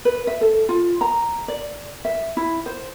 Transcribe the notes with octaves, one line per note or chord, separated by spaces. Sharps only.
B4
E5
A4
F4
A#5
D5
E5
E4
C5